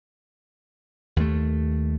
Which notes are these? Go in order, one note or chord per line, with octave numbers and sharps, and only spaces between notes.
D#2 A3